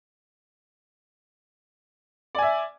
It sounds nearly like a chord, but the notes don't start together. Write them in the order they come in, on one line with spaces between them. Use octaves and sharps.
D5 G#5 E5